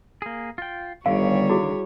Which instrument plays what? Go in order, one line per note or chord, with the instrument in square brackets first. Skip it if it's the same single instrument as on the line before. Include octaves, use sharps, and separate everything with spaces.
[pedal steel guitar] A#3 G#4
F4 G5
[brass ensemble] G1 [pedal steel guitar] D3 D#3 [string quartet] G3 C#5 [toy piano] F5
[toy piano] E4 F#4 G#4